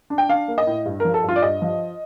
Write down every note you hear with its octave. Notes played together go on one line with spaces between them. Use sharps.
D4
G5
D4 F5
A#3
D#5
A2
G2
F3 A#4
A4
G2 F4
D5
G2 D#5
F3